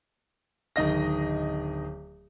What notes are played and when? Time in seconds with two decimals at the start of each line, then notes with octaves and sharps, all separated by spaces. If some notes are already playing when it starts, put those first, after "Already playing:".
0.76 D1 D#3 D#5 A#6